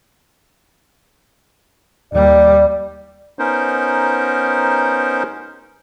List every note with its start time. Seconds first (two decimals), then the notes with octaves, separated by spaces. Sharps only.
2.13 D#2 G3 D5
3.39 B3 C#4 D#4 A#4 C5